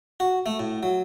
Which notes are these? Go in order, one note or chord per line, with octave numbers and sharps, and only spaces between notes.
F#4
A3
A2
F#3